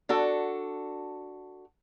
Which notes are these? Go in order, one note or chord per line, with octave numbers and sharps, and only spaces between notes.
D4 F#4 A4